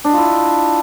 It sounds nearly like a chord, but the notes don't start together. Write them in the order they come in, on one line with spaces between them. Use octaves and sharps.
D4 D#5 F4 E4